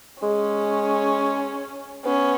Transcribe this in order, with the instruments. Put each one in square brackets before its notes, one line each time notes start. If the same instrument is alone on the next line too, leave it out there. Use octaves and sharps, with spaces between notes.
[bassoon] G#3 [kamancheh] C#4
[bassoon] B3 [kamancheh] C#4